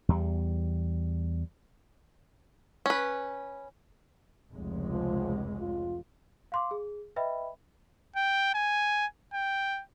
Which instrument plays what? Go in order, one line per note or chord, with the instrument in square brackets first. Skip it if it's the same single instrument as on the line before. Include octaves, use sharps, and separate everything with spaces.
[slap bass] E2 G3
[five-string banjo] C#4 B4
[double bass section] F1 C#2 G#3
[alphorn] F3
F4
[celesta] F5 C6 D6
G#4
B4 D#5 E5 G5 B5
[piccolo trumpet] G5
G#5
G5